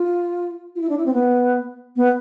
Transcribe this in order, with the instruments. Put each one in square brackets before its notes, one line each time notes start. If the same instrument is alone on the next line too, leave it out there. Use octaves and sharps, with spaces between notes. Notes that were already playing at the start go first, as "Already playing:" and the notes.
Already playing: [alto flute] F4
F4
E4
D4
E4
C4
B3
B3